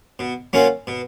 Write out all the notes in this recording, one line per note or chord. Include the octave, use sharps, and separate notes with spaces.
B2
F#3 A#3 C#4 F4
B2